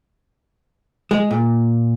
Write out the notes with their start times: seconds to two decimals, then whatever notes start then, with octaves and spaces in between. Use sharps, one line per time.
1.11 G#3
1.31 A#2